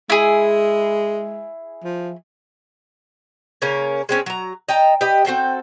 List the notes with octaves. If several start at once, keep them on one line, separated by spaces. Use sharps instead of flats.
G#3 E4 G#4
F3
C#3 A#3 C#4 A#4
G#3 C4 C#4
F#3 A#5
D#5 G5 A5 A#5
G4 B4 D#5
C4 F#4 A4 G5